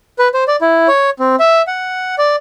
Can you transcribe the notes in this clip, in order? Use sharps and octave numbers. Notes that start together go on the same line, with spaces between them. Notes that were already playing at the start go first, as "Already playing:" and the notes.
B4
C5
D5
E4
C#5
C4
E5
F#5
D5